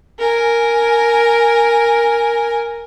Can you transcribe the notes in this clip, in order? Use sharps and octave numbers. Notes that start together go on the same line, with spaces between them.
A#4 G#5